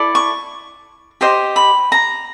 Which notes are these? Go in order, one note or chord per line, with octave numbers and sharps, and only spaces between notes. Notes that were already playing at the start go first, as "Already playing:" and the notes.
Already playing: E4 A4 D5
C#6
G4 C5 D#5 C6
B5
A#5